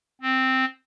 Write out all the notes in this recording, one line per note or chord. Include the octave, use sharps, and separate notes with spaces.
C4